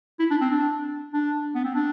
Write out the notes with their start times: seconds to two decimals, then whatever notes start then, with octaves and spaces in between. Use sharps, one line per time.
0.19 E4
0.31 D4
0.41 C4
0.50 D4
1.14 D4
1.55 B3
1.64 C4
1.75 D4